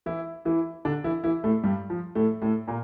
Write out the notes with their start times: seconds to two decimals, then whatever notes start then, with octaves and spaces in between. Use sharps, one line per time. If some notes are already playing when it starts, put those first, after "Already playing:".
0.06 E3 E4
0.45 E3 E4
0.85 D3 D4
1.04 E3 E4
1.24 E3 E4
1.44 A2 A3
1.63 G2 G3
1.90 F3
2.15 A2 A3
2.42 A2 A3
2.67 A#2 A#3